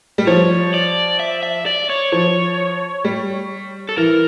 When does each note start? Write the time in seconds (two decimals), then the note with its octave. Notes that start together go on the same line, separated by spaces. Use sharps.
0.18 G3
0.27 F3 C#5
0.74 D5
1.20 E5
1.43 E5
1.66 D5
1.89 C#5
2.12 F3 C#5
3.05 G3
3.89 A4
3.97 E3 A#4